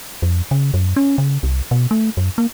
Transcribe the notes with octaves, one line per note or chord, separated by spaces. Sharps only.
F2
C#3
F#2
C#4
C#3
C2
B2
A3
F#2
A#3